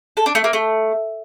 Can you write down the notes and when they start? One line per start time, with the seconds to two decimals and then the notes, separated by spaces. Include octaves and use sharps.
0.17 A4
0.26 D4
0.35 A3
0.44 A#3
0.53 A3